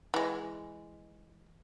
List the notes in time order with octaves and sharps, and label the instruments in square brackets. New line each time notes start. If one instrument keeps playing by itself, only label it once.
[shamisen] E3 G#3